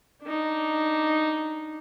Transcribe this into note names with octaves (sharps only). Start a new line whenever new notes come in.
D4 D#4